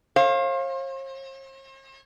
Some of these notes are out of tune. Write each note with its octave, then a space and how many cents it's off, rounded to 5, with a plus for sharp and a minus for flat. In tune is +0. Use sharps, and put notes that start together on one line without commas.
C5 +45 F5 +0